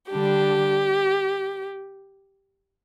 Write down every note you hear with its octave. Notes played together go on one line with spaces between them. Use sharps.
D3 G3 D4 G4